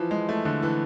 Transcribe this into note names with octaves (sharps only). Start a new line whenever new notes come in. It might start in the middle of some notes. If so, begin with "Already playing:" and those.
Already playing: E3 F3
G#3
A3
D3
E3